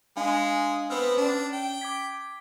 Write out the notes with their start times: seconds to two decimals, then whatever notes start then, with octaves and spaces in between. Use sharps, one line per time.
0.17 G#3 D4 F5 G#5
0.90 B3 C4 B4 F6
1.17 C#4 D4
1.53 G5
1.81 D6 G#6 B6